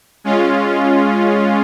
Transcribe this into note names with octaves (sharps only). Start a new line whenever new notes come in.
G#3 C#4 F4